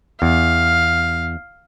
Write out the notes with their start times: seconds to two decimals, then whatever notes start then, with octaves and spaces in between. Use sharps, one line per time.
0.22 E2 F5